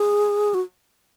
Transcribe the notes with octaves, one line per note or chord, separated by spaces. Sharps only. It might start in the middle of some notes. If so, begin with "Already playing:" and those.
Already playing: G#4
F#4